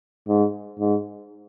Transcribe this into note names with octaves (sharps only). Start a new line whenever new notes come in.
G#2
G#2